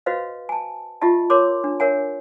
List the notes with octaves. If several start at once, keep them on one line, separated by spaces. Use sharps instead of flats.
F#4 B4 C5 D#5 F5
G#5 A5
F4 G4 D#5 E5 A5
A#4 C#5 C6 D6
D4
A#4 C#5 E5 F#5 G#5